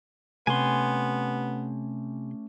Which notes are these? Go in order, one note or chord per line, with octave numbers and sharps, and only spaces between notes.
C3 A3 B3 C#4 G4 G#5 C6